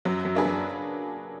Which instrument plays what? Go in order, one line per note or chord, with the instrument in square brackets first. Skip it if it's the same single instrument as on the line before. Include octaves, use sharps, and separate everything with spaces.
[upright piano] F#2 [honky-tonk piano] F#3
[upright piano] F#2
[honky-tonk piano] A#3 D4 G#4 B4
[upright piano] F#2